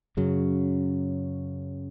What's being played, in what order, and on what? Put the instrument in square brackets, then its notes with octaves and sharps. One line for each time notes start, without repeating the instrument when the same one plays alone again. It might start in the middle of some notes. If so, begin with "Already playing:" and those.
[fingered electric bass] F#2 C#3 F#3